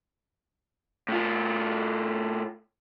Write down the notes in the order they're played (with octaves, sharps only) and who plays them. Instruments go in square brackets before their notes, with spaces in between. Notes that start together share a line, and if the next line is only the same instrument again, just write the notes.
[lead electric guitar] A2 F4